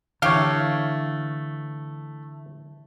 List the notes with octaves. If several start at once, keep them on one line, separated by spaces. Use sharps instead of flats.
D3 E3 A3 G4 C#5 F5